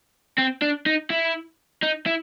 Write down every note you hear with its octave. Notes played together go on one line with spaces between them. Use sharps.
C4
D4
D#4
E4
D#4
E4